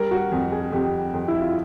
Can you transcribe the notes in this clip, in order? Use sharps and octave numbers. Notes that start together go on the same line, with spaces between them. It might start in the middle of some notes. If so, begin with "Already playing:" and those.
Already playing: G3 A#4
F#4
F2
G#4
F2 G4
F2
E4
F4